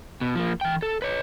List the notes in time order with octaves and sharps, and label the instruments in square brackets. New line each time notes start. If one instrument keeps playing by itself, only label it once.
[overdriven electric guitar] B2
F3 A#3
E3 G5
A4
B4 C#5